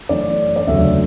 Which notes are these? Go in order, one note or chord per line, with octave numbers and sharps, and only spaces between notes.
F#2 E3 A3 C#4 D5
D5
E1 D2 C#3 F#3 E5